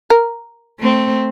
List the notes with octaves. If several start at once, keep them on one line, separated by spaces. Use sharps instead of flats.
A#4
A3 C4